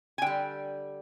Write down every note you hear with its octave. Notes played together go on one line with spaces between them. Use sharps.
G#5
D3 G3 G5